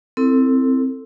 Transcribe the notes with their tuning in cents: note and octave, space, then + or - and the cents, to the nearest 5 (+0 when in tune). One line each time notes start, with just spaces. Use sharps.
C4 +0 E4 +0 A4 +25